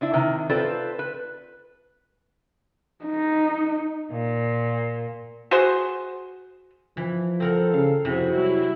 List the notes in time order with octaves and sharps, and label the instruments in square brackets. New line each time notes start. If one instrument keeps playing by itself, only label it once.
[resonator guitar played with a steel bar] C4 D4 E4
C3 D#3
C4 F4 A4 B4 C5 D5
B4
[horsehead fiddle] D#4
[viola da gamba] A#2
[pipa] F#4 G#4 C5 F#5
[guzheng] E3 [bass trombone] F3
[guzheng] C4 A#4 F#5 [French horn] A4
[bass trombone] C#3 [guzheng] F5
[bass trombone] F2 [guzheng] C3 [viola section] E4 F#4 G#4
[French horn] F#3 [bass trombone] G3 [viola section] E4